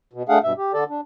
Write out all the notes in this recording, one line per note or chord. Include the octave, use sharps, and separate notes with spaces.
B2
A3 D4 G#4 F5 F#5
G2 B2 E5
G4
D3 A4 D5
D4